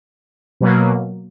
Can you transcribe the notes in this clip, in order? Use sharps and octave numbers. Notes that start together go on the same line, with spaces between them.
B2 F#3 A#3